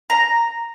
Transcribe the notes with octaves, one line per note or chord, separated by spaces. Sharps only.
A#5